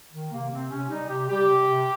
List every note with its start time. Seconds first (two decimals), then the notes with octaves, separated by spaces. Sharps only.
0.13 D#3
0.31 C3 A#3
0.51 C3 C4
0.70 C3 C#4
0.89 G3 D#4
1.09 C3 G4
1.28 G3 G4
1.47 C3
1.67 C3